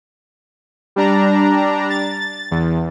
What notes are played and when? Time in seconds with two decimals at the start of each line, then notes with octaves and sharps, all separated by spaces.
0.96 G3 D4 A#5
1.90 A6
2.51 E2